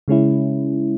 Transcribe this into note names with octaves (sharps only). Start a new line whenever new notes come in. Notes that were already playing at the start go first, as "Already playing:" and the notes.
C#3 G#3 C#4 E4